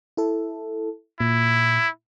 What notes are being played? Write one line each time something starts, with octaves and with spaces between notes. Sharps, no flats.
E4 A4
A#2 E4